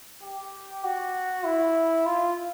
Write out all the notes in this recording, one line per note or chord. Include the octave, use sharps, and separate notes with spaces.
G4
F#4
E4
F4